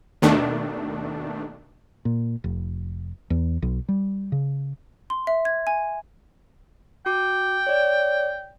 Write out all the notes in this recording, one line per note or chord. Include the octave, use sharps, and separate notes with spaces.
D#2 B2 D#3 A3 D4
A#2
F1
E2
B1
G3
C#3
C6
E5
G#6
G#5
F#4 G5 D6
C#5 D5